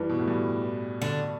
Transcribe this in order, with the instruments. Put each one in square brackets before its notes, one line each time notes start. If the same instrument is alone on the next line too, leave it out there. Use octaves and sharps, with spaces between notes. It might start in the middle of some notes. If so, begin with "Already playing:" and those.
Already playing: [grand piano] G2 [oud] E3
[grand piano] B2
A2
G2
[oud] D3